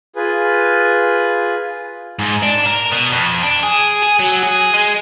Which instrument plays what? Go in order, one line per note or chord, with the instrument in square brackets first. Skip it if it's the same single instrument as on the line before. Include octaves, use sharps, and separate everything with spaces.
[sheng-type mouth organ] F4 G#4 B4
[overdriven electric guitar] G#2
D4
A#4
B2
F2
D4
G#4
G#4
F#3
G#4
G#3